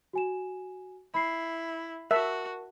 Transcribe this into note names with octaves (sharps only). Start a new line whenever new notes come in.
F#4 G#5 E7
E4 B5 C7
F#4 A#4 E5 A5